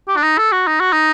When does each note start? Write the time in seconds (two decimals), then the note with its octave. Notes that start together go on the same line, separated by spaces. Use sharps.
0.08 G4
0.17 D4
0.23 D#4
0.38 A4
0.52 F#4
0.67 D#4
0.80 F#4
0.93 D#4